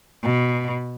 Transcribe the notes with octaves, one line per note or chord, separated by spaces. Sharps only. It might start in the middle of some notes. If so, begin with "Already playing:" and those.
B2